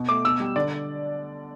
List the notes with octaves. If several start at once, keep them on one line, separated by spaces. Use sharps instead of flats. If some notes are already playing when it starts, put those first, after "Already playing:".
Already playing: B2
A3 D6
B2 E6
G3
D3 D5